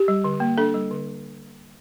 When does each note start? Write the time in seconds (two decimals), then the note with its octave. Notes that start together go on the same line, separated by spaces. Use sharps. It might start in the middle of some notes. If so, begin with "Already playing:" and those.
Already playing: G4
0.08 G3
0.24 D3
0.40 A#3
0.58 D4 A4
0.74 G3
0.91 D3